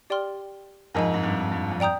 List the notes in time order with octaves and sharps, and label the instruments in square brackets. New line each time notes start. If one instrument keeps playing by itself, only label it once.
[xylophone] G4 D5 G5 C6 F6
[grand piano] F2 G#2 [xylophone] A#4 D#5 G#5
[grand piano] G#2
G2
G2
F2
[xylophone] D5 G5 A#5 D#6 G6